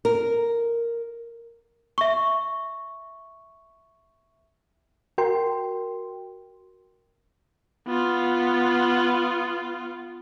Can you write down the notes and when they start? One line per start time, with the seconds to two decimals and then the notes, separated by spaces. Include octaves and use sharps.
0.05 A#4
1.98 E5 C#6
5.18 F#4 A#4 G5 C6
7.87 B3 F4